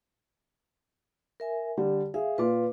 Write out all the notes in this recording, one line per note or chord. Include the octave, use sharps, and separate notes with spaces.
A#4 E5 G#5
D3 G3 G4
G#4 E5 F5
A#2 F4 B4 D6